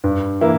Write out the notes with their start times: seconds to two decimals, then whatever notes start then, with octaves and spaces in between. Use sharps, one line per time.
0.04 G2
0.41 E3 A#3 E4